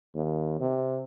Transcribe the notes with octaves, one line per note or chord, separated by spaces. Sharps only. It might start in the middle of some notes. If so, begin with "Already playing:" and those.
D#2
C3